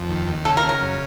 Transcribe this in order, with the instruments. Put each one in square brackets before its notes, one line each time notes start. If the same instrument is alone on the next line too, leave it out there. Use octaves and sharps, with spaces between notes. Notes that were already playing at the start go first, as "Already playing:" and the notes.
Already playing: [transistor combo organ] F2
D#2
D#2
[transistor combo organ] C#3 [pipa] A4
[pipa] A#4
[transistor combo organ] C#3
[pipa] A#4
[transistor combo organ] F#2